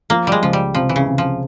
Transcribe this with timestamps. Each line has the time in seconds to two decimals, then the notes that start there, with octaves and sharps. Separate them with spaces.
0.10 F3 A#3
0.27 G3 G#3
0.42 C#2 F3
0.53 G3
0.74 C3 F3
0.89 E3
0.96 C#3
1.07 C3
1.18 F3